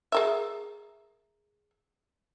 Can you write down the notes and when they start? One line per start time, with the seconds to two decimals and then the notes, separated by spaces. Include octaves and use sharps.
0.12 G#4 A#4 E5